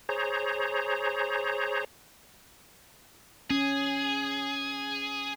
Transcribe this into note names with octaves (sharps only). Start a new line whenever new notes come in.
G#4 C5 C#5 A#5
C#4 G#4